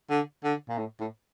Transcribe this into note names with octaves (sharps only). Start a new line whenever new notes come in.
D3
D3
A#2
A2
A2